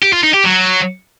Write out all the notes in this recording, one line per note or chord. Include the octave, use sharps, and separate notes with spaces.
G4
F4
D#4
G4
F#3